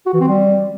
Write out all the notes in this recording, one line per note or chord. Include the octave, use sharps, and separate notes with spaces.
F#4
E3
C4
G3